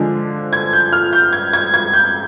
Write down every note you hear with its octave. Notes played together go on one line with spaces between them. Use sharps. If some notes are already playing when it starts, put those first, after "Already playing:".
Already playing: D3 F3 G#3 D4
G#6
G6
F6
G6
G#6
G#6
G#6
G6